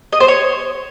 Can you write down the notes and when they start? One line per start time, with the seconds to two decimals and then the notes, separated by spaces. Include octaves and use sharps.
0.12 D#5
0.20 C5
0.28 C#5